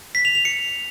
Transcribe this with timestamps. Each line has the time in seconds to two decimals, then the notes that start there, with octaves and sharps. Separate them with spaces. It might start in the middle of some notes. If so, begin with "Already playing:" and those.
0.15 B6
0.25 F7
0.35 F7
0.45 C#7